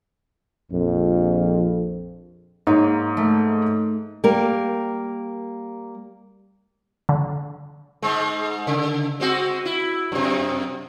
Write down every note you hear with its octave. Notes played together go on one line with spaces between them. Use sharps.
A#1 F2
G#2 A#3 D#4 C#5
A3
G3 A#3 G4 A#4
D3
G#2 G#3
C#3
G#3 C4 F#4
E4
F#2 C3